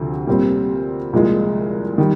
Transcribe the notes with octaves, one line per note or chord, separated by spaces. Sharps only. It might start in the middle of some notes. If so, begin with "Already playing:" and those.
Already playing: D2 C3 F3 C4
A#2 G3 C4
C2 A#2 F3 G#3
D#3 G3